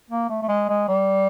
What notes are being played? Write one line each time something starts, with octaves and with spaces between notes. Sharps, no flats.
A#3
A3
A3
G#3
G#3
G3